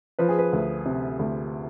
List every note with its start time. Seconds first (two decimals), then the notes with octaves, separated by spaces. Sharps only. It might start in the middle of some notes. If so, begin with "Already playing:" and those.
0.19 F3 B4
0.29 G#4
0.39 B4
0.53 D2
0.85 C3
1.19 D2